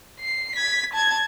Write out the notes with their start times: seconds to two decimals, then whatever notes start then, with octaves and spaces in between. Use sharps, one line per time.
0.20 C7
0.55 G#6 B6
0.94 A5 G#6